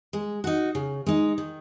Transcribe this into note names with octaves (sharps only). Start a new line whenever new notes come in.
G#3
D#4 F#4
C#3
G#3 D#4
D#3